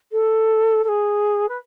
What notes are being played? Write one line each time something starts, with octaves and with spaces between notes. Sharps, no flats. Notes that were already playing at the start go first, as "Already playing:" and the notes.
A4
A4
G#4
B4